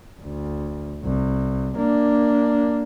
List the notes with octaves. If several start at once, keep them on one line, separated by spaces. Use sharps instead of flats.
D2
C2
A#3 D4